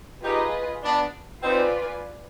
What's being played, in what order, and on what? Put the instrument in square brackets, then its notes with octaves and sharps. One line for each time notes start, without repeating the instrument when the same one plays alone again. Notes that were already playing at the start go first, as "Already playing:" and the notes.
[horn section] D#4 G4 [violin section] F4 G#4 B4 D#5
[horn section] B3 D4
[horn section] C4 D#4 [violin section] F4 B4 D5 G#5